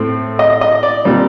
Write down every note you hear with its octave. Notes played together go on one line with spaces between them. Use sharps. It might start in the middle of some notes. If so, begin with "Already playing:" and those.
Already playing: A2 A3 C4
D#5
D#5
D5
A#2 G3 C4